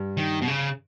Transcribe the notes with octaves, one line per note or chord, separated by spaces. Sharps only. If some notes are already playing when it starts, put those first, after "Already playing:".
Already playing: G2
D#3
B2
C#3